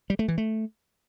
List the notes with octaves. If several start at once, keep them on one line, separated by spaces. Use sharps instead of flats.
G3
A3
E3
A3